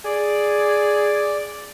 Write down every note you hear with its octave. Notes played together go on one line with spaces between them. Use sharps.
G#4 D5